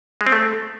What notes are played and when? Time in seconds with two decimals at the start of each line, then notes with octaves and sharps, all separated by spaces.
0.21 G#3
0.27 C4
0.32 A3